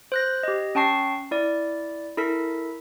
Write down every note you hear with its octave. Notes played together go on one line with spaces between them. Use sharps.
C5 F#6 A#6
G4 D#5
C#4 G5 A5 C#6 C7
E4 D5
E4 A4 A#4 B6